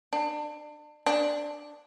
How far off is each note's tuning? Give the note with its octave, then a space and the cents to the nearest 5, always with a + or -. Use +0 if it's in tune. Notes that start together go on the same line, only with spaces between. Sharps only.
D4 +30
D4 +5